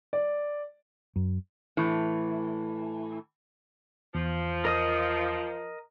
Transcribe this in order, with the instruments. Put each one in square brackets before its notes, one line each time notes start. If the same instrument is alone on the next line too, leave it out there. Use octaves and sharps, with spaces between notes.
[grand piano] D5
[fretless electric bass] F#2
[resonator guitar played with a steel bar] A2 E3
[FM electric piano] E2 [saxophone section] F3
[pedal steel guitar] A#4 D#5 D#6